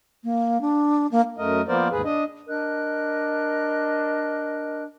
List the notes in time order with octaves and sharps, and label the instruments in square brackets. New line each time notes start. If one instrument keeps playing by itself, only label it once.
[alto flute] A#3
D4
A#3
[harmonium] F#2 A3 A#4 D#5
F3 A#3 B3 A#4 C5 D5
D#2 G#2 G#4 B4
D4 D#5
[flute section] D4 A#4 D#5 F#6